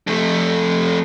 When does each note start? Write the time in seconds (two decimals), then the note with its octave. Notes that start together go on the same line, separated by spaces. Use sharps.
0.07 F2 A3